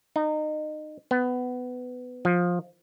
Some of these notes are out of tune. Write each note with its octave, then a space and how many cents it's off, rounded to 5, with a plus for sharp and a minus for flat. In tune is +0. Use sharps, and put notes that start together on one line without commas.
D#4 -25
B3 +15
F3 +15